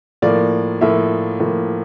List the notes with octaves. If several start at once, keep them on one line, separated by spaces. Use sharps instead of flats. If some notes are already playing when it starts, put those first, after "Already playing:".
A2 F3 A#3 D5
A2 F3 A#3 E5
A2 F3 A#3